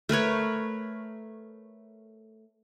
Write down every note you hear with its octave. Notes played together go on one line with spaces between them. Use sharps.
A3 A#4 B4 C#5